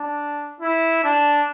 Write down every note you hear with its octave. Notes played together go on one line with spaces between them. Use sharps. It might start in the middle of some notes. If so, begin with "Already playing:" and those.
Already playing: D4
E4
D4